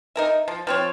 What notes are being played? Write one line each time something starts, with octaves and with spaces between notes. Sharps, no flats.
D#4 A#4 E5
F3
F3 C4 C#5